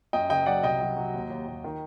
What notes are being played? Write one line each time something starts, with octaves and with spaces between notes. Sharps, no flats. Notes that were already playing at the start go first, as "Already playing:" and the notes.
F#2 D#5 G5
F#1 D#5 G5
F#3 D5 F#5
C2 D#5 G5
F#3
F#3
D#2
D#2
D#2
D#3